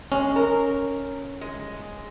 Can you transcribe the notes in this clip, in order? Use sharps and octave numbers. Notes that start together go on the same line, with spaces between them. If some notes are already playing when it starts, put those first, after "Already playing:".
G#3 C#4
A#4
G#3